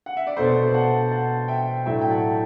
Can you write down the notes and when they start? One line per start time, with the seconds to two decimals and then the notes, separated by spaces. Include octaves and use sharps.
0.06 F#5
0.17 E5
0.27 D5
0.37 B2 A3 D4 A4 C5
0.74 F#5 A5
1.11 F#5 A5
1.48 E5 G5
1.86 A2 F#3 A3 D4 E5 G5
2.01 G5
2.10 F#5 A5